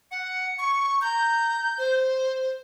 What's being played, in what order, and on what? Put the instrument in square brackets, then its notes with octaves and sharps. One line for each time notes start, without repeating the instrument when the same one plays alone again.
[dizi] F#5 [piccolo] C#7
[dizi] C#6
[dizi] A#5 [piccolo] G6
[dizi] C5